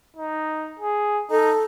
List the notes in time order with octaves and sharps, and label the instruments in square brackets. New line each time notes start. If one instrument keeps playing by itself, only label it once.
[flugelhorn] D#4
G#4
[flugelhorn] D#4 [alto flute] A4